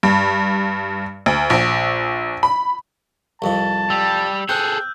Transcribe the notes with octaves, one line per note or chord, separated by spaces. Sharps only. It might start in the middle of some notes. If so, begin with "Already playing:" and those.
G2
D2
A#1
B5
C2 F2 F3 A5
G3 E6
C4 G#4 A4 F#6 G6